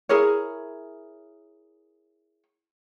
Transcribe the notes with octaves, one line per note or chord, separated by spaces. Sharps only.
E4 G#4 A#4 C#5